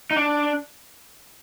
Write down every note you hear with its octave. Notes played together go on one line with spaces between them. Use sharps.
D#4
D4